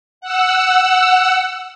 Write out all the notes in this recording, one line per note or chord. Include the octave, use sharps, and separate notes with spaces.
F#5 E6